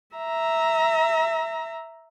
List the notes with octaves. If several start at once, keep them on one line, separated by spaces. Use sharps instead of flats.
E5 A#5